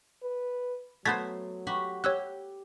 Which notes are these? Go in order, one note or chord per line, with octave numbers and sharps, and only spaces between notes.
B4
F#3 A3 B3 C5 G#6 A6 B6
F#4 G4 B5
G4 C#5 E6 F#6